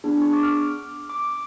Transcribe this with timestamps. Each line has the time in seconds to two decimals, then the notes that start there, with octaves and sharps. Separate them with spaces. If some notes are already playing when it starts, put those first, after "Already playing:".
0.04 B3 D4 G#4
0.22 C#6
0.33 D6
0.43 F6
1.10 D6